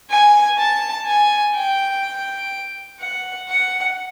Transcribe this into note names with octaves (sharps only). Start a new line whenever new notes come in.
G#5
A5
G#5
G5
F#5
F#5